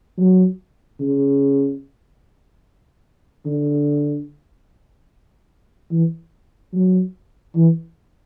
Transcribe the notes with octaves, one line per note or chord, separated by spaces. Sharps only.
F#3
C#3
D3
E3
F#3
E3